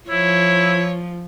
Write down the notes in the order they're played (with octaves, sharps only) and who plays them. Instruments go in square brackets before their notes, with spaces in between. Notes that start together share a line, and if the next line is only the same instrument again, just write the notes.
[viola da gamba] F3 [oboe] E4 [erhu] C#5